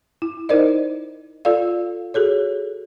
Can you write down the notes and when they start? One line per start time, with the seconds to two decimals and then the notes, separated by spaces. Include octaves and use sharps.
0.22 E4
0.49 D#4 E4 A#4 C5 D5 D#5
1.45 F4 A4 D5 F5
2.14 F#4 G#4 A4 C#5